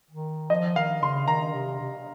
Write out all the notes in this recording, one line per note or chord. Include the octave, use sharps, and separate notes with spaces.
D#3
F3 D#5
D#3 F5
C#3 C6
D#3 A#5
C3
C3